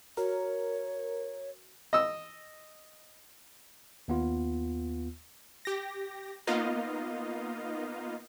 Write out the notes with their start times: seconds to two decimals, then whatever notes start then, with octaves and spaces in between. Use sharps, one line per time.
0.17 F#4 A#4 C#5
1.93 D#5 E6
4.08 D#2 B3 F4
5.65 G4 A#6
6.47 A#3 B3 D#4 F4 D#5 F5